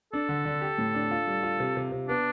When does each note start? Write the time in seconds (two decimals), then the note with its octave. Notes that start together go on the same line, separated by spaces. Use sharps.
0.13 D4 A4
0.29 D3
0.46 D3
0.61 G4
0.78 A2
0.94 D4
1.11 F4
1.27 G3
1.43 F4
1.60 C3
1.77 C3
1.92 C3
2.09 B3 D4